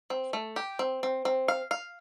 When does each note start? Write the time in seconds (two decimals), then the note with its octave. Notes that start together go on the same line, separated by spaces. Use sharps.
0.10 C4
0.33 A3
0.56 G4
0.79 C4
1.03 C4
1.25 C4
1.48 F5
1.71 F5